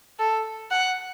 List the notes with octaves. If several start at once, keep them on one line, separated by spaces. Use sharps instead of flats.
A4
F#5